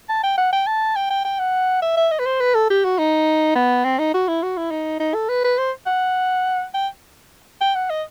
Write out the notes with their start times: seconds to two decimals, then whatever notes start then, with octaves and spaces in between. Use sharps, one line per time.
0.09 A5
0.24 G5
0.38 F#5
0.53 G5
0.67 A5
0.96 G5
1.10 G5
1.25 G5
1.39 F#5
1.82 E5
1.97 E5
2.11 D#5
2.20 B4
2.26 C5
2.41 B4
2.55 A4
2.70 G4
2.84 F#4
2.99 D#4
3.55 B3
3.85 C4
3.99 D#4
4.14 F#4
4.28 E4
4.43 F#4
4.57 E4
4.71 D#4
5.00 D#4
5.14 A4
5.29 B4
5.44 B4
5.58 C5
5.86 F#5
6.74 G5
7.61 G5
7.75 F#5
7.90 D#5